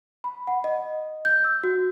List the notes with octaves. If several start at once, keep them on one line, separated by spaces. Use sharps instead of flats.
B5
F#5
D#5
G6
E6
F#4